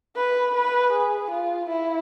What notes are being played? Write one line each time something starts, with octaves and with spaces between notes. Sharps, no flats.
B4
B4
G#4
F4
E4